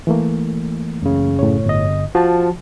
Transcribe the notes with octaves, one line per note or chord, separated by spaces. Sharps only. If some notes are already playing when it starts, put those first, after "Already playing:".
E3 A3 A#3
F#2 C#3
A2 C#5
G1 D#5
F3 F#4 A5